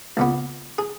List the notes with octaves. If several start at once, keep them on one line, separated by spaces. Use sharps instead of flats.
C#2 A#2 B3
G#4